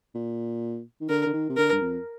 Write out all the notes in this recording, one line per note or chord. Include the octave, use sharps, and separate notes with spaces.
A#2
D#3
D3 A#4
D3
D#3
C3
D3 A#4
G2
F2